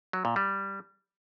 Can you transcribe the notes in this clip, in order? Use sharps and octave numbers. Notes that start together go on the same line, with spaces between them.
F#3
A#2
G3